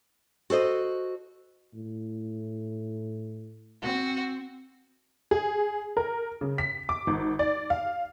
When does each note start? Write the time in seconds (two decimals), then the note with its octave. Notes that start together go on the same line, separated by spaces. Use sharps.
0.50 F#4 A4 C5 D#5
1.74 A2
3.83 C4 F#4
5.31 G#4
5.97 A#4
6.41 C#3
6.58 B6
6.89 D6
7.07 G#1
7.39 D5
7.70 F5